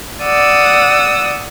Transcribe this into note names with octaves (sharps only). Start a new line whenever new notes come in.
D5 F#5 D#6 E6